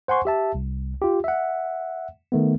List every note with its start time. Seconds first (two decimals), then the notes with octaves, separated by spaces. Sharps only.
0.08 C5 F#5 G#5 C6 C#6
0.25 G4 E5 A5
0.55 C2
1.02 F4 G4
1.24 E5 F#5
2.32 D#3 A3 B3